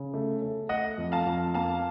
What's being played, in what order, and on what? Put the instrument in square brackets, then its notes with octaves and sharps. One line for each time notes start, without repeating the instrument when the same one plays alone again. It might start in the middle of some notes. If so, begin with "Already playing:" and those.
Already playing: [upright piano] C#3
A3
A3
[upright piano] A3 [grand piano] D#5 F#5
[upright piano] F2
[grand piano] F5 A5
[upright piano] F2
[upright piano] A#3 [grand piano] F5 A5